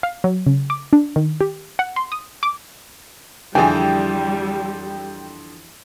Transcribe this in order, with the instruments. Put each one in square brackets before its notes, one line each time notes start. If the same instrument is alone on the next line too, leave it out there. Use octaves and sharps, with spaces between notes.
[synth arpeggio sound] F5
F#3
C#3
D6
D4
D#3
G4
F#5
C6
D#6
D6
[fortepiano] F2 D3 [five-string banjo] E3 G#4 [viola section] G3 [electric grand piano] G5